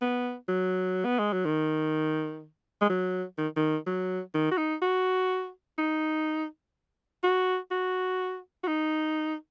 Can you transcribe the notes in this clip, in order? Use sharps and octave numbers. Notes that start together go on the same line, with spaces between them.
B3
F#3
B3
G#3
F#3
D#3
G#3
F#3
D#3
D#3
F#3
D#3
F#4
D#4
F#4
D#4
F#4
F#4
F#4
D#4